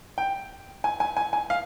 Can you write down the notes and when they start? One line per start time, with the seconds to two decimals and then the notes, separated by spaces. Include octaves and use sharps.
0.18 G5
0.84 G#5
1.00 G#5
1.17 G#5
1.33 G#5
1.50 F5